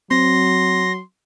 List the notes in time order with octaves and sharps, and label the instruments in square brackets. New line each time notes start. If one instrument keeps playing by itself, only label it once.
[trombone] F#3 [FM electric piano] C4 [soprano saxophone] C6 [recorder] A#6